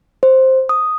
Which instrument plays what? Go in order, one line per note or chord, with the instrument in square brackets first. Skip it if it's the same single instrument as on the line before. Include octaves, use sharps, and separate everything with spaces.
[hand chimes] C5
D#6